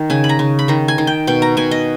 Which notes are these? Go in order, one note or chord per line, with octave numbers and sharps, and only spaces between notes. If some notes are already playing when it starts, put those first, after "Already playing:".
Already playing: D#3
C#3 G#5
B5
A#5
C#3
B5
D#3 A#5
G#5
D#3
G5
B2 G5
A#5
B2 G#5
D#5